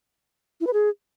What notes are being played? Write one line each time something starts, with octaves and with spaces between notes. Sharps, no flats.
E4
B4
G#4